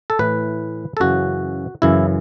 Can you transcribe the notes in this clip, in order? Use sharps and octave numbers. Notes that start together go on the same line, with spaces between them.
A4
A2 E3 B4
A4
F#2 C#3 E3 F#4
F#2 C#3 E3 E4